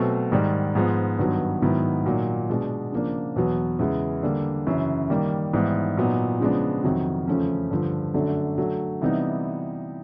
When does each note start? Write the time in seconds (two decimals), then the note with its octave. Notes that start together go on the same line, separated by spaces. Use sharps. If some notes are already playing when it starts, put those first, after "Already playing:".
Already playing: B2 F#3 A3 C4
0.32 G#2 D#3 G3
0.75 G#2 F3 G#3 B3
1.19 G2 D#3 F#3 B3
1.62 G#2 D#3 F#3 B3 E4
2.06 A#2 F#3 A#3 D#4
2.49 B2 G#3 B3 D4
2.92 C#3 F3 A#3 D4
3.36 E2 B2 F#3 B3
3.79 E2 C#3 E3 G#3
4.23 D3 G3 A#3
4.66 F#2 C#3 E3
5.10 D#3 G3 A#3
5.53 G#2 E3 G3 B3
5.97 A#2 F#3 B3 D#4
6.40 C#3 F3 G#3 B3 D4
6.84 F2 C3 D#3 F#3
7.27 E2 C#3 F3 A3 C#4
7.71 G2 D3 F3
8.14 F#2 D3 F#3 A3 D4
8.58 D3 F#3 A3
9.01 C3 E3 G3 B3 D#4